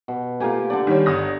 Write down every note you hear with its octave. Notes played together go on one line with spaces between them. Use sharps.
B2
A3 A#3 F4 G4 G#5
D3 A4 D5
D#3 G3 C#5
G1 D#6 A#6